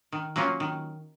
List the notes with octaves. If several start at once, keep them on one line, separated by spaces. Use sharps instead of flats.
D#3
F#3 A#3 C#4 F4
D#3